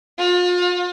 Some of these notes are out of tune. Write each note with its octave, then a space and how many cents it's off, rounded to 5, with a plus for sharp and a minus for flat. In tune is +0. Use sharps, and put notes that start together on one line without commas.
F4 +35